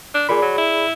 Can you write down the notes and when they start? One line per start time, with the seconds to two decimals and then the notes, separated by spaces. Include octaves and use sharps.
0.15 D4
0.29 A#2 G#4 D5 B5
0.42 F#3
0.58 E4